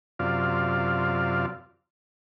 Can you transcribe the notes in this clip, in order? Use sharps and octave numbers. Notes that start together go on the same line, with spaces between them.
F#2 C3 F4 D5 F5